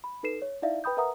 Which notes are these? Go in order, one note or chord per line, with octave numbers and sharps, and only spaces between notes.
B5
D#4 A4 B4 C7 E7
C#5
D#4 E4 D5 E5 F5
B4 G5 B5 D#6 G6
A#4 B4 E5 F#5 A#5 D#6